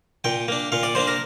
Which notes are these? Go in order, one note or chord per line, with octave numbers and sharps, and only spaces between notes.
A#2 G5
A#3 D4
A#2 F5
D5
A#3 D4 C5
A#4